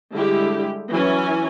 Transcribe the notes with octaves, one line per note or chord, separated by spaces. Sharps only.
D3 G3 G#3 E4 G4
E3 F#3 C#4 G#5